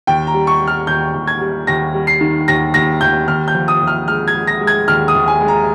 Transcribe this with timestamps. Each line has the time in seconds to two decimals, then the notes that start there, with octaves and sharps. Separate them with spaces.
0.07 D#2 G5
0.27 A#5
0.34 G3
0.47 C#6
0.60 G3
0.67 F6
0.87 D#2 G6
1.14 D#2
1.27 G#6
1.41 G3
1.67 D#2 A#6
1.94 G3
2.07 C7
2.21 D#3
2.48 D#2 A#6
2.74 D#2 A#6
3.01 D#2 G6
3.28 D#2 F6
3.48 G6
3.54 F3
3.68 D#6
3.81 D#2
3.87 F6
4.08 G#3 F6
4.28 G#6
4.34 G#3
4.47 A#6
4.61 G#3
4.67 G#6
4.88 D#2 F6
5.08 D#6
5.15 D#2
5.28 G#5
5.41 G#3
5.48 A#5